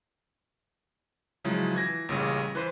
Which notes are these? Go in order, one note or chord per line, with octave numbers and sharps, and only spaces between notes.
C#3 F3 F#3 G#3 E4
E3 G#6 A#6
A1 A#2 C#3 G3
E3 B4 C5